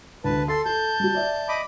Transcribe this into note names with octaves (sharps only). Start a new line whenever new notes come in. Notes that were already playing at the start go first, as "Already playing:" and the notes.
D2 B4 A5
A4 C6 A6
A4 A5 G6
G3 F#4
D5 E5
D#5 B5 D6